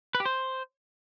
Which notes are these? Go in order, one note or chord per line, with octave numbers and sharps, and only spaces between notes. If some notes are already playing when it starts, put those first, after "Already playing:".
B4
G4
C5